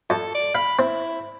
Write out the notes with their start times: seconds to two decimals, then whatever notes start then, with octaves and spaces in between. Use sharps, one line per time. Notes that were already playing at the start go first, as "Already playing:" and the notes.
0.10 F2 A4
0.35 D5
0.55 F5 B5
0.79 C4 E4